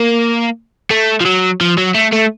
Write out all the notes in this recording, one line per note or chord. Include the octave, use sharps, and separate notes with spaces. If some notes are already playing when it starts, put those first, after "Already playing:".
Already playing: A#3
A3
F3
F#3
F3
F#3
A3
A3